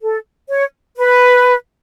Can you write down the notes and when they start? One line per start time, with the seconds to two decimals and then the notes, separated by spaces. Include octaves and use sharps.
0.02 A4
0.49 C#5
0.97 B4